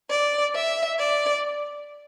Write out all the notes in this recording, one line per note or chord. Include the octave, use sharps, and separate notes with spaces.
D5
E5
D5